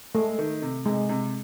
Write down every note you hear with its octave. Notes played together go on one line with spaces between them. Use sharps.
G#3 A3
D#3
C3
C3 G#3
C3